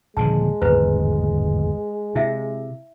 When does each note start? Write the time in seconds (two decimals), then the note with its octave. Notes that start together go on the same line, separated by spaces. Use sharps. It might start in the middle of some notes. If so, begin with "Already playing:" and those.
0.17 D#1 D3 F3 G#3 A5
0.62 D1 G#1 E2 B4 C5 A#5
2.15 C3 E4 E5 F5